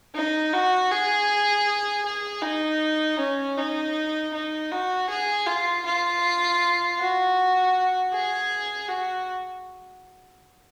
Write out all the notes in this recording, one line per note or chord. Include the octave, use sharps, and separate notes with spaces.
D#4
F#4
G#4
G#4
D#4
C#4
D#4
D#4
F#4
G#4
F4
F4
F#4
G#4
F#4